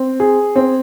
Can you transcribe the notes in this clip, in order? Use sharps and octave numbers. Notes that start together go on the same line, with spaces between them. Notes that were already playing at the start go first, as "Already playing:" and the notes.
Already playing: C4
G#4
C4